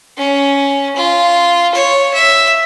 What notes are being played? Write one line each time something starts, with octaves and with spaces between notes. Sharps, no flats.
C#4
F4
C#5
E5